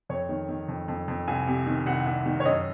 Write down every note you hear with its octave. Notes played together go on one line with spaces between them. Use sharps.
F2 C#5
D#3
D#3
F2
F2
F2
C2 G#5
C3
D#3
C2 F#5
C2
D#3
C#5
F#2 D#5